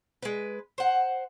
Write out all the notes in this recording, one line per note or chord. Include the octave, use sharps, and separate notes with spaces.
G#3 B4
C5 F#5